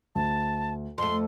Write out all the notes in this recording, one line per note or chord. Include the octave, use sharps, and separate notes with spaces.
D2 A5
F2 A3 C6